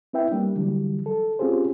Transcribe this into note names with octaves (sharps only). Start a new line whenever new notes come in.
C4 E4 B4 E5 G5
G3 A#3 D4
D3 E3 F#3 G3
A4
C4 C#4 F4 G4 G#4 C5